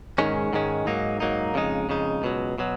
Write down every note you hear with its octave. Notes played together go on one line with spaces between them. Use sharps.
G#2 D#3 G#3 C#4
G#2 D#3 G#3 C#4
G#2 F#3 A#3 D#4
G#2 F#3 A#3 D#4
F2 C#3 G#3 D#4
F2 C#3 G#3 D#4
C#2 B2 F#3
B2 F#3